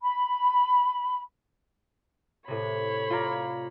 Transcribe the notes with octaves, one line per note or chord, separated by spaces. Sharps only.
B5
A2 C3 C#5 B5
F4 D5 A#5